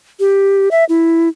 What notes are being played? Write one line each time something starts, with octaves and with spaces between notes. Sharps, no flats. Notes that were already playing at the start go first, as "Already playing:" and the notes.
G4
E5
E4